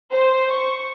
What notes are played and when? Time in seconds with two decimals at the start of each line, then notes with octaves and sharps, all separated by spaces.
0.11 C5
0.52 C#6